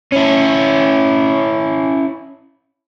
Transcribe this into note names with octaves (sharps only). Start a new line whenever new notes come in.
C#4 E4